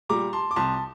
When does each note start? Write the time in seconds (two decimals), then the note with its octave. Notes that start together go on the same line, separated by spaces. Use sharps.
0.09 A#2 G3 A#5 D6
0.33 A5 C6
0.51 D6
0.56 C2 A5 C6